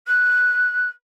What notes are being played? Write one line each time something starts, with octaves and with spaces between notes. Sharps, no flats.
F#6